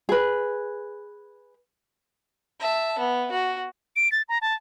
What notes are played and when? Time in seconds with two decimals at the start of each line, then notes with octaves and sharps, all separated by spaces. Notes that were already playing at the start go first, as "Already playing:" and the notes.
0.09 G#4 B4
2.60 E5 A5
2.99 B3
3.31 F#4
3.96 D7
4.12 A6
4.29 A#5
4.42 A5